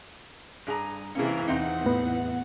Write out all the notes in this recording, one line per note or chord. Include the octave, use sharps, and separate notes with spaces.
G2 G#4 A#5
C3 E3 A#3 C#4 G#4
E2 E3 C4 D#4 F#5
A2 B3